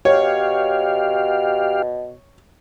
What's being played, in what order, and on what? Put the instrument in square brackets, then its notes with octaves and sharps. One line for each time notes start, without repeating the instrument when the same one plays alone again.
[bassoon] B2 [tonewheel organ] G4 F5 [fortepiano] C#5